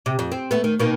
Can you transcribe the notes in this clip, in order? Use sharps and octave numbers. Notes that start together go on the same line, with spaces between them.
C3
F2
C4
A3 B3
D#3
B2 D#3 A#3